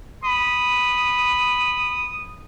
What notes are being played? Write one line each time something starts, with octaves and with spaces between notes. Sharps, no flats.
B5 D#6